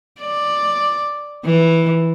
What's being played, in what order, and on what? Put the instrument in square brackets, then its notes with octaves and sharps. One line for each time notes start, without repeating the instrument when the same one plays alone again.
[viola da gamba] D5
E3